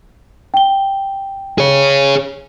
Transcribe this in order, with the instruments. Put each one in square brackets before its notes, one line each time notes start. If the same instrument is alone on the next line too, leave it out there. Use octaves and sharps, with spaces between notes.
[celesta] G5 G7
[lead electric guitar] G#4 C#5